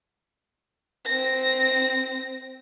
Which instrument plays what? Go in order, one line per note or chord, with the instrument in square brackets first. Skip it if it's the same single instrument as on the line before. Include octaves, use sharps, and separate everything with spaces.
[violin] C4 A#6